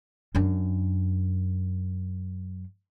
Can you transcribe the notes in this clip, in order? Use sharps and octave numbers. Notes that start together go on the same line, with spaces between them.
F#2 D4